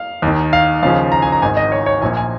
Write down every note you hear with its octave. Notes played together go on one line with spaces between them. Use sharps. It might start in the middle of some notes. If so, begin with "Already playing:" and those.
Already playing: F5
D#2 D#3
F5
D#2 C#3 F3 F5
A#5
G#5
A#5
G#1 G#2 D#3 G#5
D#5
C#5
C#5
A#1 A#2 F3 G#5
G#5